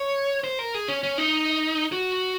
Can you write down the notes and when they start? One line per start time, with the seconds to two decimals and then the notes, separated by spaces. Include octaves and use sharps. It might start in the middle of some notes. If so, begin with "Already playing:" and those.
Already playing: C#5
0.44 C5
0.59 A#4
0.74 G#4
0.88 C#4
1.03 C#4
1.18 D#4
1.92 F#4